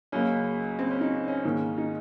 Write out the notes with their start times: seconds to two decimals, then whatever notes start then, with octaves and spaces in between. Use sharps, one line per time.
0.12 C#2 C#3 F#3 A#3 C#4
0.79 C4
0.90 C#4
1.01 D#4
1.28 C#4
1.44 G#2 D#3 A#3
1.78 D#4